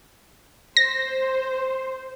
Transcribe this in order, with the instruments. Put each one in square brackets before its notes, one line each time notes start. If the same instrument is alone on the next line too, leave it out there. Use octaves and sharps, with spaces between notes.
[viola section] C5 [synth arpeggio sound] A#6